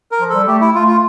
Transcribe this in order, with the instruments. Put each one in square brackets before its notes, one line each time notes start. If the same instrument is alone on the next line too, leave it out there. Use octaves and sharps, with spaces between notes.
[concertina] A#4
[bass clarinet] F3
[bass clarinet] G3 [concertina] A4
[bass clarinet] A3 [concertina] G4
[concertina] E4
[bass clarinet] A3 [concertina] F4
[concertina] F4